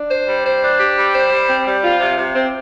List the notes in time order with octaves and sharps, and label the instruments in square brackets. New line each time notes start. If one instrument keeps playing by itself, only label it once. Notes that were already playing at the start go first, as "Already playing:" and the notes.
Already playing: [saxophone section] D4
C5
G3
C5
D4
G4
G3
C5
G3
C4
G3
F4
C3
C3
C4